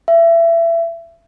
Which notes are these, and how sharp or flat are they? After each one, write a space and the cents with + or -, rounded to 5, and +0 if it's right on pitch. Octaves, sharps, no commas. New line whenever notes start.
E5 +25